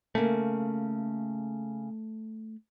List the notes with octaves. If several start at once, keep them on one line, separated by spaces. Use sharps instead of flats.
C#3 A3 A#3